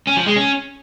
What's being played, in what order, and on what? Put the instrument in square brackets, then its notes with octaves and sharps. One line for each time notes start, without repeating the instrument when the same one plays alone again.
[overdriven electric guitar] C#4
F3
G#3
C#4